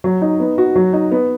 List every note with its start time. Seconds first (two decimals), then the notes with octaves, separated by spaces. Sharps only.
0.04 F#3
0.22 D#4
0.40 B3
0.58 F#4
0.75 F#3
0.93 D#4
1.11 B3